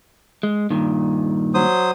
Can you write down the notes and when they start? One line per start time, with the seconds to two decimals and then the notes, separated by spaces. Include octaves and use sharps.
0.43 G#3
0.70 G2 A#2 D#3
1.54 F#3 C5 D#6